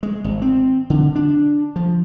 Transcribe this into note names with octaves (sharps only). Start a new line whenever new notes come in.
G#3
G#1
C4
D3
D4
F3